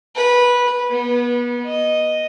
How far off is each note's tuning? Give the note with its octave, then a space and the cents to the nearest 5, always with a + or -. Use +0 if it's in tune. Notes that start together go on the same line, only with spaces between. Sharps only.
B4 -15
B3 -30
D#5 +0